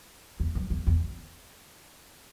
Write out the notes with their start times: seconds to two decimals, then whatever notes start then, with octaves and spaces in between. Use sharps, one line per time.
0.40 E2
0.55 F#2
0.70 E2
0.87 E2